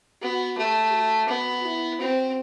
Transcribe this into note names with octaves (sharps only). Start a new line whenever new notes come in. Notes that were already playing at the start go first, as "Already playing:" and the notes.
B3 F#4
A3 G4
F#4
B3
E4
C4 F#4